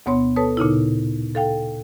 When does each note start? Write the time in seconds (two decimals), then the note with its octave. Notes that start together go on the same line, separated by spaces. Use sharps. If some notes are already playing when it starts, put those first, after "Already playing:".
0.06 D2 B2 B3 C#5 C6
0.36 A4 B4 C#5 A5 D#6
0.57 A#2 C#3 D#4 E4
1.35 A4 F5 G5